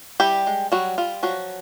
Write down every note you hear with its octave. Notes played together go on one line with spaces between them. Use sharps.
G3 E4 G4
G#3
F#3 G3 F#4
G3 F4
F3 F#3 F#4